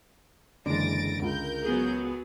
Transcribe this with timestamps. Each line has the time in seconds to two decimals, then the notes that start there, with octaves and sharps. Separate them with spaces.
0.66 F#1 D3 E3 G#3 A6 A#6 D7
1.22 C#2 F4 A#4 G6
1.63 F#3 B3 G#4